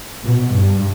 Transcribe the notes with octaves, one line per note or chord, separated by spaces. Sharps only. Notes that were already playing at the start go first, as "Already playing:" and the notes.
B2
G2